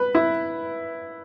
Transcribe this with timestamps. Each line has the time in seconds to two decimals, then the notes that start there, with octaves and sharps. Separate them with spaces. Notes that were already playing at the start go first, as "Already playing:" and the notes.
Already playing: B4
0.15 E4